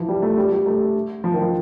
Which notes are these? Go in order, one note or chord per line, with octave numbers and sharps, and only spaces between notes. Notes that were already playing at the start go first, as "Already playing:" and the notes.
Already playing: E3 F3
G3
A3
G3
G3
A3
F3
D#3
F3